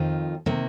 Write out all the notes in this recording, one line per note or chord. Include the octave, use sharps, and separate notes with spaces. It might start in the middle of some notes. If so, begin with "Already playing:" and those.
Already playing: F2 D#3 F4 C5
C3 D#3 A#3